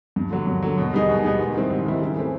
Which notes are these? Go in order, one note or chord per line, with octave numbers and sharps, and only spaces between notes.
G2
D3 F#3
G2
D3 F#3
B2
G3 B3 D#4 G#4
B2
G3 B3 D#4 G#4
G#2
D#3 G3 C4 E4
G#2
D#3 G3 C4 E4
C#3
E3 A3 C4